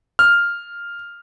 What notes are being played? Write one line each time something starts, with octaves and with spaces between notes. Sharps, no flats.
F6